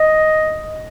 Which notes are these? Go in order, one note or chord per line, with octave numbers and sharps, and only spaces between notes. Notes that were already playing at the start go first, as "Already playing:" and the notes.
Already playing: D#5